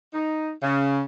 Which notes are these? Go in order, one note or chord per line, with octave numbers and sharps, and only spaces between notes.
D#4
C#3